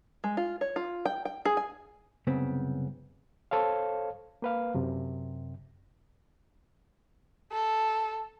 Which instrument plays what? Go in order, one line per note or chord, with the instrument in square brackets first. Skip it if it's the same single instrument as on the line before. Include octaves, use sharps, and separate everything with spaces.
[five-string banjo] G#3
F4
C#5
F4
G5
G5
G#4
G#5
[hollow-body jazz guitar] C2 F#2 C#3 B3 C4
[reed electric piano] A4 C5 C#5 F5
A#3 B4 F5
F#2 C3
[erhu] A4